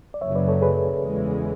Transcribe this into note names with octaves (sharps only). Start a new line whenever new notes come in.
D5
F#1 F#2 C#3 F#3 C#5 E5
B4 D5
A4 C#5
G#4 B4
E2 C#3 E3 G#3